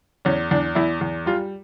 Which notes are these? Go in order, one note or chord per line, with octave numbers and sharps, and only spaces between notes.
E2 C#4
E2 D4
E2 E4
E2
G3 F4